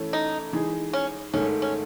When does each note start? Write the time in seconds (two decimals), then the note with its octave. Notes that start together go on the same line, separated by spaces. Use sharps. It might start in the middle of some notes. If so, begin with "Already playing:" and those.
Already playing: E3 A3 C#4
0.13 D#4
0.53 E3 G#3 D#4 G#4
0.93 C#4
1.33 G#2 D#3 A3 C#4
1.62 C#4